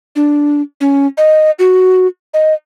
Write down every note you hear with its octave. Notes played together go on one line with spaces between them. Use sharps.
D4
C#4
D#5
F#4
D#5